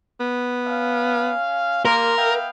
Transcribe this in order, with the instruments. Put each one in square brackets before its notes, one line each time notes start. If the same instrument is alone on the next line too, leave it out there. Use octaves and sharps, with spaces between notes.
[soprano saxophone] B3
[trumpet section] C#4 F5
[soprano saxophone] A#3 [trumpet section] G4 C6 [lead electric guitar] A#4
[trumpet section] B3 E5 G5 [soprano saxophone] F5